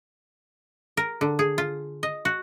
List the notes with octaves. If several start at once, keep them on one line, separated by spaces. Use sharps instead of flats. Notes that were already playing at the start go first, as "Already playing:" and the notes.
A#4
D3
G#4
F4
D#5
F#4